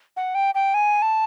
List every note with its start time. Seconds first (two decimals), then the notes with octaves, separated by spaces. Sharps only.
0.16 F#5
0.35 G5
0.55 G5
0.74 G#5
1.02 A5